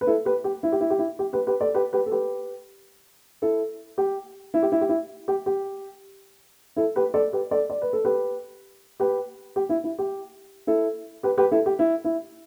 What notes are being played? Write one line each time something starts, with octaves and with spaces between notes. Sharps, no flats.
B4
E4 A4
G4 B4
G4
E4
G4
E4
G4
E4
G4
G4 B4
G4 B4
A4 D5
G4 B4
G4 B4
A4
G4 B4
E4 A4
G4
E4
G4
E4
G4
E4
G4
G4
E4 A4
G4 B4
A4 D5
G4 B4
A4 D5
D5
B4
A4
G4 B4
G4 B4
G4
E4
E4
G4
E4 A4
G4 B4
G4 B4
E4 A4
G4
E4
E4